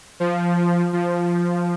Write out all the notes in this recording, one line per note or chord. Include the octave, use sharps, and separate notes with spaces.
F3
F3